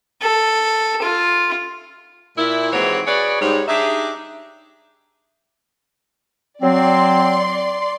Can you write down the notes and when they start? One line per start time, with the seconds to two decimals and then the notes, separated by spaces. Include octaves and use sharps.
0.23 A4
1.02 F4
2.37 A#2 E4
2.71 D#2 G#2 E3 C4 F#4 C#5
3.07 F#4 G#4 B4 C#5 D5
3.41 G#2 G3 C#5
3.68 D4 D#4 G4 G#4 E5
6.62 F#3 C4 D5 C6